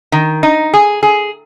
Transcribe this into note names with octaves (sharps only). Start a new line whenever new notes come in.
D#3
D#4
G#4
G#4